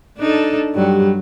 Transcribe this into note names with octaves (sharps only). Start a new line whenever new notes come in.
D4 D#4 A4
G2 F#3 G3